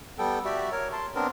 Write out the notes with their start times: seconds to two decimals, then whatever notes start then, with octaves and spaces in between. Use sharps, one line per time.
0.19 G3 B3 A4 G5
0.45 F#4 G4 D5 E5
0.72 A#4 C#5
0.93 A5 C6
1.15 B3 C4 D4 A#4